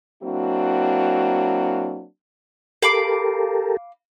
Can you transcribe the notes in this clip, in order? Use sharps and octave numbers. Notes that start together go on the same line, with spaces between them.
F#3 A#3 C4 D4 E4 F#4
G4 A4 A#4 F5 B5 D6